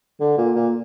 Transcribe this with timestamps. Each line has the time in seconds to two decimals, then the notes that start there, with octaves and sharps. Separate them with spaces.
0.20 D3
0.38 A#2
0.56 A#2